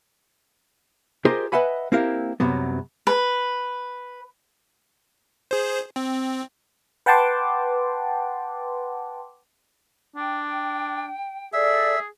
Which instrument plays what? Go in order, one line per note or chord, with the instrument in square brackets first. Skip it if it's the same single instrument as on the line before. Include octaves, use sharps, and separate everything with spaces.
[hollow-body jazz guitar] F4 G4 G#4 A#4 C5 D#5
B4 D#5 E5 F#5 G#5 B5
A#3 C4 E4 G4 A#4 F5
C2 F#2 C3 F#3 B3
[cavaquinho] B4
[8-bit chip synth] G#4 C5
C4
[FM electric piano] B4 F#5 G5 A5 C6 D6
[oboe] D4 [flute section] G5
[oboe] G#4 [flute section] A4 D5 [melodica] E5